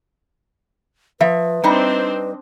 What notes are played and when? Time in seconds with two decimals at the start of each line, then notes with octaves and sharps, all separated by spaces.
1.21 F3 B4 E5
1.64 G3 C4 D4 D#4 C5 D#5